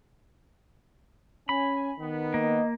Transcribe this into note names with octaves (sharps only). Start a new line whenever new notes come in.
C#4 G#5 B5
D#3 B3
A#3 D#5